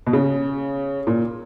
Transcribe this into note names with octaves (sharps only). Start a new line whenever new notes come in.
B2
C#3
A#2